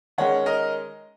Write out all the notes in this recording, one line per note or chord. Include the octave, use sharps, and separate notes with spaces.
D#3 G#3 C#4 C#5 F#5
A#4 D#5